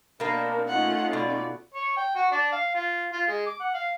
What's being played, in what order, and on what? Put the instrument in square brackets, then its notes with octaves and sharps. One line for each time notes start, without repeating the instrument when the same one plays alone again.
[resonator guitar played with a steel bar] B2 A#3 [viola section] C4 D4 [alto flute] A#4
[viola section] A3 C#4 F4 [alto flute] D#4 [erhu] F#5
[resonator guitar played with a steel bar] B2 [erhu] D5
[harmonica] C#5
G5
F#4
D4
F5
F4
F4
G#3
D6
F#5
F5